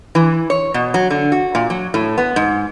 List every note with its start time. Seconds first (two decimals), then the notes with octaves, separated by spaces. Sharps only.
0.15 E3
0.50 C#5
0.74 B2
0.94 F#3
1.10 D3
1.32 F#4
1.55 A#2
1.70 F#3
1.94 A2
2.18 B3
2.36 G#2